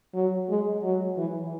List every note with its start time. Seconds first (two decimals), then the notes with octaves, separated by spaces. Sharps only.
0.14 F#3
0.49 G#3
0.83 F#3
1.17 E3